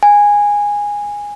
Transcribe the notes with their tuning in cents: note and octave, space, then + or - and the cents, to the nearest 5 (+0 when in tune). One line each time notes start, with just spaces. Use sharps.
G#5 -10